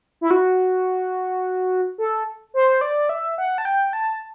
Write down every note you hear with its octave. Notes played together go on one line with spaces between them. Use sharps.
E4
F#4
A4
C5
D5
E5
F#5
A5
G5
A5